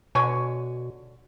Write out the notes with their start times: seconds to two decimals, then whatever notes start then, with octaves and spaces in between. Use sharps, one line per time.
0.15 B2 D3 C#5 G#5